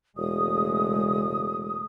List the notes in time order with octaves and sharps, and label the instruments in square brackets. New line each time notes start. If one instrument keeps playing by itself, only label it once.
[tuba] E1 [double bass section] C#3 G#3 A3 [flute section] D#6